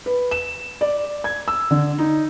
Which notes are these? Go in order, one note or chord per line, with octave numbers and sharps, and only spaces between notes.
B4
E7
D5
G#6
E6
D3
D#4